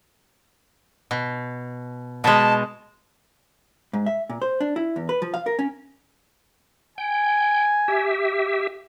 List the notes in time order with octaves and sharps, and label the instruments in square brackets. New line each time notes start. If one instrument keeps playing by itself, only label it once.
[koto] B2
[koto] B2 G#3 [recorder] A5
[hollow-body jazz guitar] G#2
E5
A#2
C5
D4
E4
E2
B4
F3
F5
A#4
C#4
[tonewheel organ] G5 [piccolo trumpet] G#5
[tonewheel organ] G4 E5